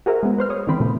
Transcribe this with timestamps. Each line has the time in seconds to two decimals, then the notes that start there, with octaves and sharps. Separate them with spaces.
0.06 F#4 G#4 A#4 C5 E5
0.23 G#3 B3
0.38 B4 C5 F6
0.50 C#5 D#6
0.67 D3 E3 C4 B5
0.80 A#2 C#3 A3 B3